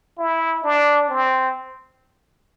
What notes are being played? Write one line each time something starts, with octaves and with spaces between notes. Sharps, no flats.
E4
D4
C4